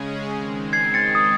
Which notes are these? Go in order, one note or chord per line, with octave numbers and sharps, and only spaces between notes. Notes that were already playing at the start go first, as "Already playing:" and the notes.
Already playing: C#3 G#3 C#4 G#4
D#3 G#3 C4
G#6 C7
A6 C#7
D#6